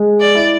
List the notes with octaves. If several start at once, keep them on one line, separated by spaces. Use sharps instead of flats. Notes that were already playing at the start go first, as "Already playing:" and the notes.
Already playing: G#3
D5
E4